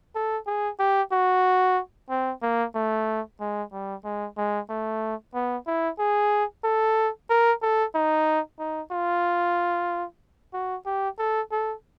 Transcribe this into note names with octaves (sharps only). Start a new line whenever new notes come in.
A4
G#4
G4
F#4
C4
A#3
A3
G#3
G3
G#3
G#3
A3
B3
E4
G#4
A4
A#4
A4
D#4
D#4
F4
F#4
G4
A4
A4